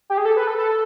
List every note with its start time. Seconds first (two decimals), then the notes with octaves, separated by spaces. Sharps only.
0.10 G4
0.18 G#4
0.25 A4
0.37 B4
0.47 A4
0.58 A4